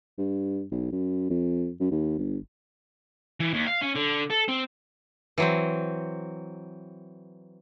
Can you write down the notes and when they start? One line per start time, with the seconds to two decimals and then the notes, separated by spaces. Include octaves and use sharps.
0.18 G2
0.71 B1
0.92 F#2
1.30 F2
1.80 F#2
1.91 D#2
2.18 G1
3.40 E3
3.54 D#2
3.67 F5
3.82 C#4
3.96 D3
4.30 A4
4.48 C4
5.38 E3 F#3 C4